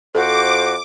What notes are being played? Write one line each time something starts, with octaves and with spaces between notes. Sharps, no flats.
F2 F#4 A4 C5 D6